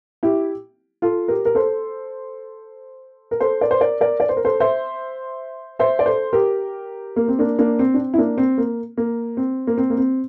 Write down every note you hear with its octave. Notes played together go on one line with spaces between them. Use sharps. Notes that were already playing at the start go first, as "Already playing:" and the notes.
E4 G4
F4 A4
G4 A#4
A#4
A4 C5
A#4
A4 C5
A#4 D5
C5
A#4 D5
A#4 D5
D5
C5
A#4
A4 C5
C5 E5
C5 E5
D5
A4 C5
G4 A#4
A#3
C4
A#3 D4
A#3 D4
C4
D4
C4
E4
A#3 D4
C4
A#3
A#3
C4
A#3
C4
A#3
C4